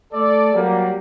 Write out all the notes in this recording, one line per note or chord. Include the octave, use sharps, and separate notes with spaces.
A3 A4 D5
F#3 G3 A#3